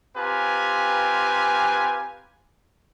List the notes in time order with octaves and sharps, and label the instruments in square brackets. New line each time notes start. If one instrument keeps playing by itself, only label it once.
[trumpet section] C4 F4 G4 B4 G#5 A#5